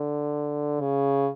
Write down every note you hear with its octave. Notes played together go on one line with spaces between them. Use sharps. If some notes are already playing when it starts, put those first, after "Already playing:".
Already playing: D3
C#3